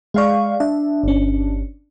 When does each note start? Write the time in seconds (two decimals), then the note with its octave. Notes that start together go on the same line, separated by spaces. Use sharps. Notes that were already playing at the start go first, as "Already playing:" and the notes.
0.14 G#3 G#4 D5 F5 C#6
0.60 D4 E5
1.03 G1 C#4